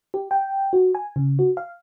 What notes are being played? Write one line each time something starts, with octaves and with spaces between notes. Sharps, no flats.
G4
G5
F#4
G#5
C#3
F#4
F5